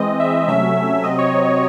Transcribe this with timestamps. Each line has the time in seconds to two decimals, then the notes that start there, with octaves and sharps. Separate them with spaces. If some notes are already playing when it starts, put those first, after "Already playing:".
Already playing: E3 G#3 C4 D#5
0.20 E5
0.48 C3 F#3 A3 C#4 E5
1.04 C3 F#3 C4 D#5
1.19 C#5